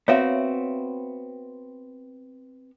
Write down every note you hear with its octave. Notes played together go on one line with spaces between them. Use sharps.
B3 C4 F#4 C#5 E5 F5